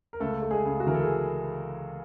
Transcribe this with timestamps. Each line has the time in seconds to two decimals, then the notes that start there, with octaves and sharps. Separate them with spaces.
0.13 A#4
0.20 C#2 A3 A4
0.42 A3
0.51 G#3 G#4
0.65 C#2
0.80 F#4
0.87 E3 A#4
0.94 A4
1.02 G#4